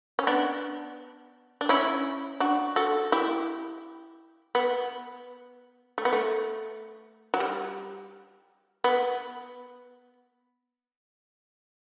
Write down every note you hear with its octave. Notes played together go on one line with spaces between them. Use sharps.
C#4
B3 D4
D4
C#4 E4
D4 F#4
F#4 A4
E4 G4
B3
A3
B3
A3
F#3
G3
B3